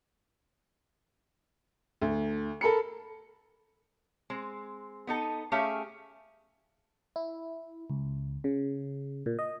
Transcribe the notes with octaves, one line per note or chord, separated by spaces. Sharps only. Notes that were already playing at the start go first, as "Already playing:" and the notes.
D2
A4 A#4 B5 C#7
G#3 C4
B3 D#4 A4
A3 C#4 G4 G#4 E5 F5
E4
C#2
C#3
A#2
D#5